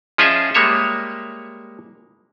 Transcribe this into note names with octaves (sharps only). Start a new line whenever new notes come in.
F3 C#4 F4 G#4 D#5 E5
G3 G#3 A#3 C#5 E5